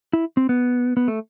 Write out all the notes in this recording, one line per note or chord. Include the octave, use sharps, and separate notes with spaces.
E4
C4
B3
B3
A3